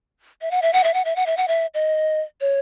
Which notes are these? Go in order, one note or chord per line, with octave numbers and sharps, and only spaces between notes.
E5
F#5
E5
F#5
E5
F#5
E5
F#5
E5
F#5
E5
D#5
C#5